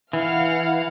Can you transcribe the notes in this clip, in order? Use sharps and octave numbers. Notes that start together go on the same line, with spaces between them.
E3 F5 F#5